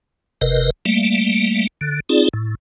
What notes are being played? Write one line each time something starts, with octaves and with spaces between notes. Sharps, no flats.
F#1 C3 A#4 B4 D#5
G3 A3 A#3
D3
C4 D#4 F4 G#4 D5
A2